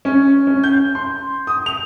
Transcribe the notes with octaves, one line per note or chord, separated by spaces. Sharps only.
C#4
C#4
G6
C6
D#6
F7